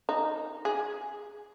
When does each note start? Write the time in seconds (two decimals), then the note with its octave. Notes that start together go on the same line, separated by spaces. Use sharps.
0.09 D#4
0.65 G#4